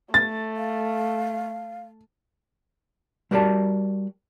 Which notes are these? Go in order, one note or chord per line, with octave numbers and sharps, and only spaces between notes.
A3 A6
F5
G3 F#4 A#4 D5 G5 A5